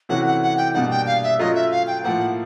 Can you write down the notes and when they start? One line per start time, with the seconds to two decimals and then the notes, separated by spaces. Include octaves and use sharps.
0.09 C3 E3 A3 C#4 F#4 F#5
0.26 F#5
0.42 F#5
0.57 G5
0.74 B2 G3 A#3 D4 F#5
0.91 G5
1.07 F5
1.23 E5
1.39 F#3 A3 C#4 F4 D#5
1.55 E5
1.71 F5
1.87 G5
2.04 A2 F3 A#3 F#5